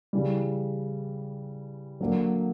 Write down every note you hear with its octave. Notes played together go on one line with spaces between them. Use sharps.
C#3 E3 G3
D3 F#3 A#3